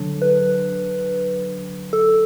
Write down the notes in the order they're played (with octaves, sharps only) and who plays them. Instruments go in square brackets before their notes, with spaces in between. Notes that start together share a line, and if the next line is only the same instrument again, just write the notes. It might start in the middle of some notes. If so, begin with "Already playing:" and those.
Already playing: [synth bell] D3 F#3 D4
B4
A4